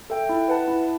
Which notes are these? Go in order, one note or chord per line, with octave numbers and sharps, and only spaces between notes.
A4 E5 G5
E4
B4 F#5 A5
E4